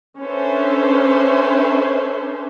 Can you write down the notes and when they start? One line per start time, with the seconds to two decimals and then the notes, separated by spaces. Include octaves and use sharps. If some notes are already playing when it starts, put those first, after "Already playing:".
0.22 C#4 D4 A4 B4 C5 E5